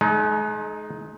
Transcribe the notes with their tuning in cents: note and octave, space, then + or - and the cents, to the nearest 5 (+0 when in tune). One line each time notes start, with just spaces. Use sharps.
G#3 +40 D#4 +0